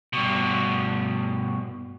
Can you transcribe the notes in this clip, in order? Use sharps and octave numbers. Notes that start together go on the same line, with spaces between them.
G2 B2